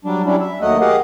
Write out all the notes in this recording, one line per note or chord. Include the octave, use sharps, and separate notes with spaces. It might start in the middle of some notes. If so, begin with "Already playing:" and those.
F#3 G3 D4
F#3 G3 C#4 D4 E4
E5
D#2 F#3 A3 D#5 F#5
G4 G#4 A#4 D#5 F5 F#5